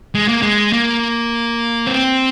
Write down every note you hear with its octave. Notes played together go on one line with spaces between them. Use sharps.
G#3
A#3
G#3
A#3
C4